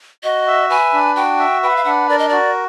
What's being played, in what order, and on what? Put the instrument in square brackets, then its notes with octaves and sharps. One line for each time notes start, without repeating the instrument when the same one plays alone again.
[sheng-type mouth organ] F#4 [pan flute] D#5
[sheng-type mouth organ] E5
[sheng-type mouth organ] B4 [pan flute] G#5
[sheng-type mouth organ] D4
[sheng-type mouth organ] F#4 [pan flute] G5
[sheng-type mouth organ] E5
[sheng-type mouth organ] B4 [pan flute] G5
[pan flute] F#5
F5
[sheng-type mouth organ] D4 [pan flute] F#5
[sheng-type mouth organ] A#4 [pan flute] D5
[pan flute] D#5
[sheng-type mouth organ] F#4 [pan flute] D5